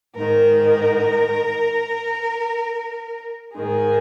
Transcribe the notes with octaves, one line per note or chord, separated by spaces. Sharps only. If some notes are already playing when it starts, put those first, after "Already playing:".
G#2 D#3 A#4
G#2 D#3 G#4